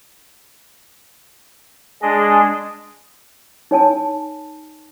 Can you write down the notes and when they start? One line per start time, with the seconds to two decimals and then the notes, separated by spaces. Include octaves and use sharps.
2.02 G#3 D4 G#4 D#5
3.71 D#4 C#5 G#5 A5